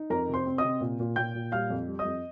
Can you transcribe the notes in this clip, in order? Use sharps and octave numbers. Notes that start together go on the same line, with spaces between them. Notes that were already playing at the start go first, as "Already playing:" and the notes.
Already playing: D#4
F2 A#4 A#5
C3
C5 C6
C4
D#5 D#6
C3
A#2
A#2
A#2 G5 G6
A#2
G3 F5 F6
F2
G3
D#5 D#6
F2